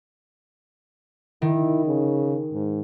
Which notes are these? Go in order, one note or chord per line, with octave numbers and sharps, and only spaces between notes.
D#3 E4
C#3
G#2